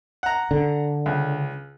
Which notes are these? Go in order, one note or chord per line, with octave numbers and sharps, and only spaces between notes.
F#5 A#5
D3
C#2